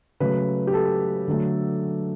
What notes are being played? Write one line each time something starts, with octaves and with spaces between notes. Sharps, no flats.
C#3 F#3 A3 B4
G4
A4
D3 F#3 A3